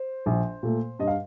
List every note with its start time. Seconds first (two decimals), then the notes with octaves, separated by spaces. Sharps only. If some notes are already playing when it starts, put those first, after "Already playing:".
Already playing: C5
0.26 A#1
0.63 A#2 A3
0.99 G2 D#5
1.07 F5